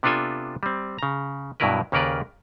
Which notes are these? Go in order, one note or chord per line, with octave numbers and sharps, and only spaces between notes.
C3 B3 D4 F4 A4 G#5
G3 C4
C#3 A#5
G2 B2 F#3 E4 A#4 B4
D#2 C#3 A#3 A#4 B4 D5